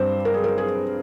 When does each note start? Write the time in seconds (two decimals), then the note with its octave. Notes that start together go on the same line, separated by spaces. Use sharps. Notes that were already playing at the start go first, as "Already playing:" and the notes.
Already playing: G2 G3 C4 C5
0.25 A#4
0.34 G#4
0.44 A#4
0.58 G#4